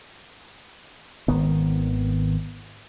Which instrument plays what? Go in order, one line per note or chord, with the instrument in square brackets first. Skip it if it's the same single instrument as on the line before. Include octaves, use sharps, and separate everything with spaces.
[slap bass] G#1 D#3 B3